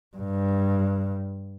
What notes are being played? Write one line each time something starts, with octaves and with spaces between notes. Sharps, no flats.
G2